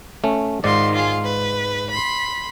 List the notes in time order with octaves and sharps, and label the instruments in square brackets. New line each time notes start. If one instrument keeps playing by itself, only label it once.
[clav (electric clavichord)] A3 C#4
[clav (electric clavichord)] G#2 D5 [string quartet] D#3 F4 C6
[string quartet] F4 G#4
B4
B5 C6